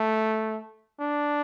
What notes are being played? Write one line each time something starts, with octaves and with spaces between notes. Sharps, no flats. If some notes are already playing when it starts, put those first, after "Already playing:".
Already playing: A3
D4